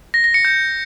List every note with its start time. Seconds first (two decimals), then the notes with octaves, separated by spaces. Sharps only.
0.14 A#6
0.24 A#6
0.34 C#7
0.45 G6